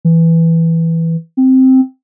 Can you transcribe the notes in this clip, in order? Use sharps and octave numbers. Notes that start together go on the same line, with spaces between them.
E3
C4